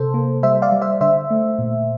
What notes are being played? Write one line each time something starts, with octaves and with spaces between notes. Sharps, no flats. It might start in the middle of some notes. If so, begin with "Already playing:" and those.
Already playing: C3 A4 C5
A#3
G3 C5 E5
D5 F5
G3
C5 E5
D3 C5 E5
A3
A#2